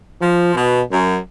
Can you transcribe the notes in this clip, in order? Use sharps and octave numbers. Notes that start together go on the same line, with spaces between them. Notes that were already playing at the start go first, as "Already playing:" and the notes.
F3
B2
F#2